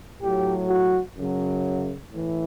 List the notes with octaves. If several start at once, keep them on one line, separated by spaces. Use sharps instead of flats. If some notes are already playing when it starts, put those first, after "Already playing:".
A2 F#3 G4
F#4
F#2 C#3 F#3
A2 E3